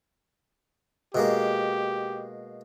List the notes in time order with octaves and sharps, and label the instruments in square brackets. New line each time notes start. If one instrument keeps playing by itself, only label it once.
[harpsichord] B2 G#3 A#3 [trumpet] G4